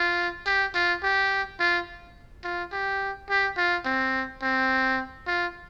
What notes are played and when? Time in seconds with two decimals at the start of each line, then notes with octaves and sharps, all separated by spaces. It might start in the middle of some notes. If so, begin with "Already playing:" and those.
Already playing: F4
0.46 G4
0.74 F4
1.03 G4
1.59 F4
2.44 F4
2.73 G4
3.29 G4
3.57 F4
3.85 C4
4.42 C4
5.27 F4